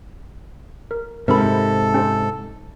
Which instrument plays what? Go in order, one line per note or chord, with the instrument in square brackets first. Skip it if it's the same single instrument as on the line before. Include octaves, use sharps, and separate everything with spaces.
[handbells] A#4
[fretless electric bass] G#2 C3 [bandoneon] A4 [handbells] A#4 B5
[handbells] C#4 G4 C5